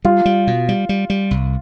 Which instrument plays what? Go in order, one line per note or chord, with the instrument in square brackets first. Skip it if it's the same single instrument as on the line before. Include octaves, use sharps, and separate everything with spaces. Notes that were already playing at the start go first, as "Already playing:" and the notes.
[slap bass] G3 [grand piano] F4
[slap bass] G3
B2
G3
G3
G3
C2